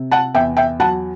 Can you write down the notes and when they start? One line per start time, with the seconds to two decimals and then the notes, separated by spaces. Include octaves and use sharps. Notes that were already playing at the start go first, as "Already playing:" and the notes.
Already playing: C3
0.11 F#5 A5
0.34 E2 E5 G5
0.57 E5 G5
0.80 F#3 F#5 A5